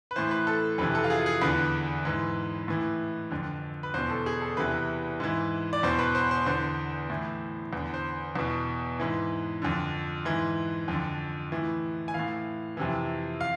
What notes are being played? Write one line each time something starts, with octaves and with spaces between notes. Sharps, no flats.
B4
A2 E3 C5
B4
A4
F2 C3 E3 B4
A4
F4
G#4
G#4
E2 D3 B4
G#2 E3
A2 E3
F2 D3
B4
E2 B2 C5
A4
G#4
A4
E2 C3 E3 B4
G#2 E3
D5
E2 B2 C5
B4
C5
C5
E2 D3 C5
A2 E3
E2 D3
C5
E2 B2
G#2 E3
F2 D3
G#2 E3
F2 D3
A2 E3
G#5
A2 E3 F5
F2 C3 E3
F5